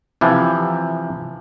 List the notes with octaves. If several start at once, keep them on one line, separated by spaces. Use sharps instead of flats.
C3 E3 F3